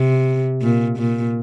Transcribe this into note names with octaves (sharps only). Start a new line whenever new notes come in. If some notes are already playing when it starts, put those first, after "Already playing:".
Already playing: C3
A#2
A#2